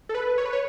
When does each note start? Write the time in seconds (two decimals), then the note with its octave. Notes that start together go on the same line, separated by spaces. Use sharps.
0.09 A4
0.15 B4
0.38 C#5
0.45 B4
0.53 C#5